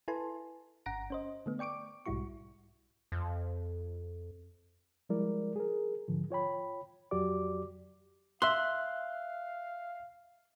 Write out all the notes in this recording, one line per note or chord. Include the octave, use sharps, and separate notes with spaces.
E4 A4 B4 G#5 A5 C6
G1 F#5 A#5 A#6 D7
C#4 C5 D#5
D3 A3 B3
D5 G5 C#6 D6 D7
B1 G#2 G3 E4 F#4 C#6
F2
F3 G3 G#3 E4 A#4 D5
G#4 A#4
G#2 D3 F3
F4 C#5 G5 B5
F2 F#3 F#4 G4 D5 D6
E5 F5 C6 F#6